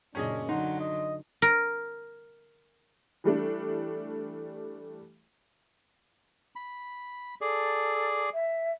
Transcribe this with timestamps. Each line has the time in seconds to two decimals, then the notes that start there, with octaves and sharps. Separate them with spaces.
0.15 F#2 A#2 C#3 C#4 D4 G#4 D#5
0.49 D3 F#3 D#4 F#5 C6
0.80 D#5
1.42 A#4
3.24 E3 G3 A3 D4
6.56 B5
7.41 G#4 A4 D5
8.33 E5